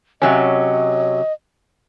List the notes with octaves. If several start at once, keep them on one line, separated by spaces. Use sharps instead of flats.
C3 F#3 C#4 D#5